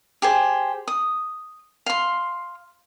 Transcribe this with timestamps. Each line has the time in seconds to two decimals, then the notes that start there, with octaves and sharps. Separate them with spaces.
0.22 G4 G#4 C5
0.88 D#6
1.86 F5 C6